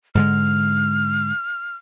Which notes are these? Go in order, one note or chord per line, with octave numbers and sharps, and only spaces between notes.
G#2 D3 G#3 F6